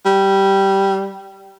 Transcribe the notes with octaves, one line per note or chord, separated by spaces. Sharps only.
G3